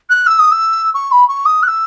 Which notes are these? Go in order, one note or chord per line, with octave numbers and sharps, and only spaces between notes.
F#6
E6
D#6
E6
C#6
B5
C#6
D#6
F#6
E6